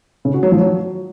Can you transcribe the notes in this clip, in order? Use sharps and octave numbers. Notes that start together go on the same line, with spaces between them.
C#3
F#4
F#3
F3
F#3